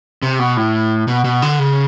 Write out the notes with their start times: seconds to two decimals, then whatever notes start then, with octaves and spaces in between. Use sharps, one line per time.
0.23 C3
0.39 B2
0.57 A2
1.08 B2
1.24 B2
1.42 D3
1.59 C#3